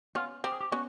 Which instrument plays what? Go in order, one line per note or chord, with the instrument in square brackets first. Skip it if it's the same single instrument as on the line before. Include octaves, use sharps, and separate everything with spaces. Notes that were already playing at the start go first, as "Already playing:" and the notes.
[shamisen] B3 C#4 [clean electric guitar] F4
[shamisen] C4 [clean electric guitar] G4
[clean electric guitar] G#4
G4
[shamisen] B3 C#4 [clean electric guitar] F#4